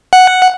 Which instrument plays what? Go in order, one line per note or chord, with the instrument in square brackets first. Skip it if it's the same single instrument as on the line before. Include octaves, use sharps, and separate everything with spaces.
[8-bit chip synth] F#5